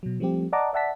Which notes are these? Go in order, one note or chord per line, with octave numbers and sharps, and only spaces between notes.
B2 F#3
F3 G3 A3 C4 G4
D5 D#5 F#5 A5 A#5 D6
D5 E5 F#5 A5 B6